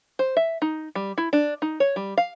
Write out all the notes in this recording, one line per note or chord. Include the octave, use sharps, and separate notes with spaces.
C5
E5
D#4
G3
E4
D4
D#4
C#5
G3
F5